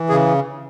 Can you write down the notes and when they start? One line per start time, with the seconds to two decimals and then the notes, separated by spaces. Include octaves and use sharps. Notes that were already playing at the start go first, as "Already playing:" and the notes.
Already playing: E3
0.09 C#3 G#4